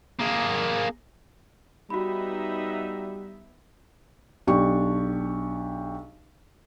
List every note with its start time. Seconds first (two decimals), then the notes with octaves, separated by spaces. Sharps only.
0.20 A#3 G#4
1.90 G3 B3 D#4 F#4 E5 B5
4.47 B1 D4 G4 C#6